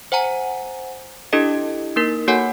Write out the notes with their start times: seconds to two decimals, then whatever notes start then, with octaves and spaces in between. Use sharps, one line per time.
0.12 C5 F#5 G#5 A#5
1.33 D4 E4 G4 A4 D#5
1.96 A#3 D#4 A#4
2.28 A#3 F#4 A4 C#5 F#5 G#5